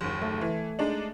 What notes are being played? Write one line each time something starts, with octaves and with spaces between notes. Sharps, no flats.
F#1 D#2
A3
E3
G#3 D4 D#4